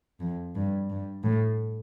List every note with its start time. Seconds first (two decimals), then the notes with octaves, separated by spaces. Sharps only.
0.20 F2
0.55 G2
0.90 G2
1.23 A2